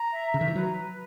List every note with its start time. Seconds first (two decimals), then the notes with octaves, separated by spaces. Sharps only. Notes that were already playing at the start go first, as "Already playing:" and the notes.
Already playing: A#5
0.12 E5
0.33 C#3 A#5
0.41 D#3
0.48 E3
0.55 F#3 B4